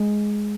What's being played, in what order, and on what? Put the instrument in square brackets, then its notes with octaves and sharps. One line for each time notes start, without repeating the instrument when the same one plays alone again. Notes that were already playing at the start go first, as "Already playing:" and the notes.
Already playing: [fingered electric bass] G#3